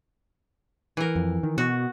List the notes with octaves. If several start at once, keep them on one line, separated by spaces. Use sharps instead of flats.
E3 A#4
F2
D#3
B2 F#4